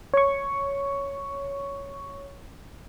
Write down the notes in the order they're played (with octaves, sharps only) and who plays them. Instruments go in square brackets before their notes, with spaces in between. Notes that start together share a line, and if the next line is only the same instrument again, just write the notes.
[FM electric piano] C#5 C#6